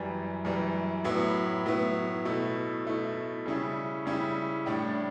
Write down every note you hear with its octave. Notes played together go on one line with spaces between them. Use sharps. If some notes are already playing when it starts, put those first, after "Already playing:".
Already playing: F#2 E3 G3
F#2 E3 G3
A2 F#3 B3 E4
A2 F#3 B3 E4
B2 A3 E4
B2 A3 E4
C#3 G3 C#4 E4
C#3 G3 C#4 E4
A2 G3 D4